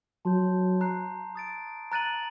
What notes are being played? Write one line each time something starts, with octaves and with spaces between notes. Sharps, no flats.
F#3 A5 C6 G6
A#5 F#6 C7
D#6 A6 D7
A#5 F#6 A6 D#7 F#7